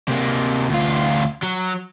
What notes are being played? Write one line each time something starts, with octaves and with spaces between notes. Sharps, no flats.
C3 A#3
D2 F4
F#3